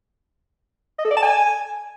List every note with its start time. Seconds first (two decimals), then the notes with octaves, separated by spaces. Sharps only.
0.99 D#5
1.05 A4
1.11 D5
1.17 A5
1.23 G#5